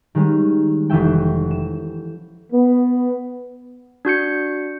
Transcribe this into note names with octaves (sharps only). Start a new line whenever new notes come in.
D#3 G3 G#3 C#4
F1 E3 C#4 E5 G5
E7
B3
D4 F#4 G6 C#7